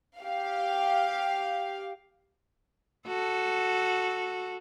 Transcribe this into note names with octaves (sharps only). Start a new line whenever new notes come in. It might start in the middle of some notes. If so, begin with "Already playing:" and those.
G4 F5
F#4 A4